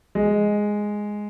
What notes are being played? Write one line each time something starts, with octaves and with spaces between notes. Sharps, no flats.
G#3